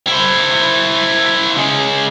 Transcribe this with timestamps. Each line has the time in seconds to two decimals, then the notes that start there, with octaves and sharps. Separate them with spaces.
0.07 E4 C5
1.57 C#3 G#3